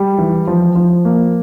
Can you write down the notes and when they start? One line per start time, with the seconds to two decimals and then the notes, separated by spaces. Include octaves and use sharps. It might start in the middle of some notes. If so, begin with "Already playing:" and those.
Already playing: G3
0.18 E3
0.47 F3
0.75 F3
1.05 A#3